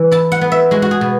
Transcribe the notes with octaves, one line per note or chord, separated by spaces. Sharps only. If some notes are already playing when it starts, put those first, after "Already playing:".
Already playing: E3
E4 A5
F#5
B3
E5
G#3 F#4
F#4
G#4
B2